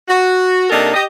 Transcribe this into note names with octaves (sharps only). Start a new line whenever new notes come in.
F#4
C3 A#3 D4 D#4 A4 A#4
G4 D#5